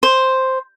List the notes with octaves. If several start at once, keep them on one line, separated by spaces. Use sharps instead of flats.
C5